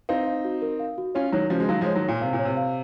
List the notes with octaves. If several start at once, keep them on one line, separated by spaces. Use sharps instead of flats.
C4 D#4 F5
F5
F#4
A#4
F5
F#4
C#4 F4 C#5
D#3 F#3 C#5
C#3 F3 F#4
G#3
D#3 F#3 F5
F3 G#3 C#5
D#3 F#3
A#2 C#5
C3 F5
A#2
C#5
C3
F5